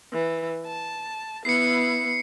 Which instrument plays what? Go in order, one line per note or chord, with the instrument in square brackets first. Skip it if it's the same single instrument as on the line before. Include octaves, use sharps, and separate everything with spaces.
[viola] E3
A5
[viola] B3 E4 [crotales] C7 C#7